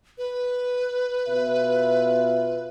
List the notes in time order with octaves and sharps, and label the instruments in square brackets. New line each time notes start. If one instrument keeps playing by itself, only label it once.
[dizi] B4
[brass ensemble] B2 F4 E5